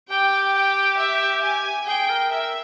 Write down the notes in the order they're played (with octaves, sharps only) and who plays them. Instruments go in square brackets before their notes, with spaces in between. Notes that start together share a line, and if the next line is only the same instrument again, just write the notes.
[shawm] G4 [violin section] G5
[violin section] G5
E5
G#5
[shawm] G#4 [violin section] G5
[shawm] A#4
[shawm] A#4 [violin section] E5